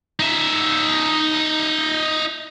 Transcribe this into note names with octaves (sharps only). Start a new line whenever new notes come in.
D#4 E5